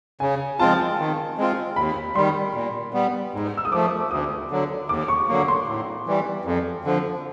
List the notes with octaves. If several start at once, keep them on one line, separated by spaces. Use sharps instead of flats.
C#3 G#5
F3 G#3 C4 F4 A5
D#3
G#3 C4 F4
D#2 B5
D#3 G3 C6
A#2
G3 B3
G#2
E6
D#6
F3 A3 D6
D2 D#6
D3 F#3
D#2 D6
C#6
D3 F#3 A#3
C6
A2
E3 G3
F2
D3 F3